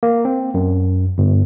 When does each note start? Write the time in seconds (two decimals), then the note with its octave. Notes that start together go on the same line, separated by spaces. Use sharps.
0.03 A#3
0.25 C4
0.54 F#2
1.18 G1